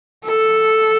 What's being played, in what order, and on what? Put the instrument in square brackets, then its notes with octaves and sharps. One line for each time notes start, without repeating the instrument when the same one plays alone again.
[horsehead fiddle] A4